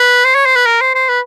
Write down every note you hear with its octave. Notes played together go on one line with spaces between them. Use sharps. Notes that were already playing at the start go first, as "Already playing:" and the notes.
Already playing: B4
C5
C#5
C5
B4
A#4
C5
C5
B4